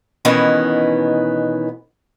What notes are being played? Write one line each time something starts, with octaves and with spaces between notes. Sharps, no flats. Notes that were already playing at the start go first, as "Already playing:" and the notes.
B2 D#3 E3 B3 C#4 D#4